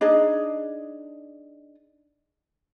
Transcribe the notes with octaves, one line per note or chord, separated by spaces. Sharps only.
D4 D#4 G#4 D#5